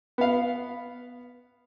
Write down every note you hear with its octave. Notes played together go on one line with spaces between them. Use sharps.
B3 F5